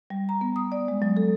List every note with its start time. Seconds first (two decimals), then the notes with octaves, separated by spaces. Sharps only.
0.10 G3
0.29 A#5
0.41 B3
0.56 D#6
0.72 D5
0.88 G#3
1.02 F#3
1.17 A4